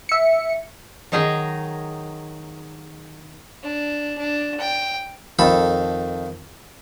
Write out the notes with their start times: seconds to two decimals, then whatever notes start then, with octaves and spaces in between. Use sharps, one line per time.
0.09 E5 C#7
1.12 D#3 F#3 D#4 G#4 G#5
3.63 D4
4.17 D4
4.59 G5
5.39 F2 D#3 A4 B5